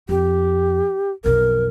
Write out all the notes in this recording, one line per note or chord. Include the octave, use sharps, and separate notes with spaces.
F2 G4
B1 F2 A#4